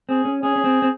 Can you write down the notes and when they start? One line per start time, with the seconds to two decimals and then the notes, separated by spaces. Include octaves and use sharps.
0.09 C4 G#4
0.25 C#4
0.43 C#4 G#4
0.56 C#4
0.64 C4
0.82 C4